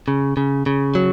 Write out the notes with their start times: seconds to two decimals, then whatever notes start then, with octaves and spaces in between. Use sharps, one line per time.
0.08 C#3
0.37 C#3
0.66 C#3
0.95 F#3